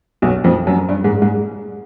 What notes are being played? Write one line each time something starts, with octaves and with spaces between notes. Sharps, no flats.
B1 B2
F2 F3
F#2 F#3
G2 G3
G#2 G#3
G#2 G#3